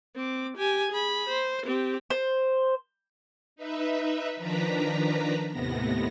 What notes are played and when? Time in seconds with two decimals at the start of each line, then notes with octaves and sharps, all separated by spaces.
0.16 C4 D6
0.57 G4 G#5
0.92 G#4 B5
1.29 C5
1.66 C4 G4
2.10 C5
3.56 D#4 B4 E5
4.36 D#3 F3 D4 B4 A#5 B5
5.50 D#2 A2 C3 B3 A#6